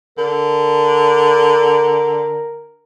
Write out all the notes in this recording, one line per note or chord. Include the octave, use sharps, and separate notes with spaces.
D3 A#4